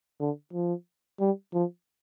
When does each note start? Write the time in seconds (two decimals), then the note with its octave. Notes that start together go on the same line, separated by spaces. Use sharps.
0.20 D3
0.53 F3
1.20 G3
1.54 F3